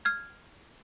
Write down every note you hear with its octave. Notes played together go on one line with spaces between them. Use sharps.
F6 G#6